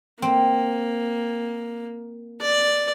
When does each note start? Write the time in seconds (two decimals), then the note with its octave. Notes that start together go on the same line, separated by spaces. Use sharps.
0.22 A#3 C4
2.41 D5